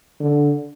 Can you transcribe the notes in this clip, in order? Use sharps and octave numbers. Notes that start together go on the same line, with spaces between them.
D3